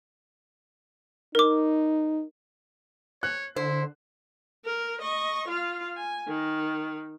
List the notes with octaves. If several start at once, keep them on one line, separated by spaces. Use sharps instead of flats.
D#4 A#4 D6
C#5 F#6
D3 E4 C5
A#4
D#5 C#6
F4 F5
G#5
D#3